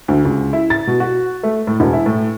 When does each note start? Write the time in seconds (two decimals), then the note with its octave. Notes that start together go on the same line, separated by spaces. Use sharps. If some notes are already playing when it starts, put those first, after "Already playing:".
0.08 D2
0.25 C#2
0.53 E4
0.70 A6
0.87 B2
1.00 F#4
1.43 A3
1.67 A2
1.80 E1
1.93 E4
2.06 A2